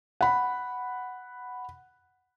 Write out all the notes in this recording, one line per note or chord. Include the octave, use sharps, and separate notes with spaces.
F#5 B5